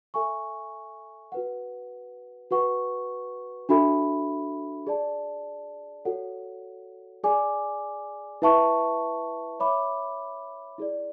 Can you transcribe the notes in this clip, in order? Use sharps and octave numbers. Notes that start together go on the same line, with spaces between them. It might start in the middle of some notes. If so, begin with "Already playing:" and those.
A4 E5 G#5 C#6
F#4 B4 F#5
F#4 B4 F#5 C#6
D4 F#4 A4 E5 B5
G#4 D5 A5
F#4 A4 C#5 F#5
G#4 D5 G#5 D6
E4 B4 E5 A5 C#6
C#5 E5 B5 D6
E4 G#4 D5